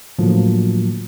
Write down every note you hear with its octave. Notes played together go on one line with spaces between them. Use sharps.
A2 D3 F3 F#3 A#3